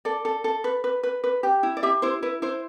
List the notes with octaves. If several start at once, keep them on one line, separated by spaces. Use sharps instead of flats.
A4 D5
A4
A4
B4
B4
B4
B4
G4
E4
D5
G4 E5
E4 C5
E4 B4
E4 C5